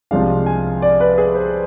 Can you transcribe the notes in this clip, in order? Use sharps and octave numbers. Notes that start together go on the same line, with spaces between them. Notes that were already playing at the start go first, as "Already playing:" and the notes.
C2 C3 F3 G#3 D4 F5
G#5
D5
B4
G#4
C5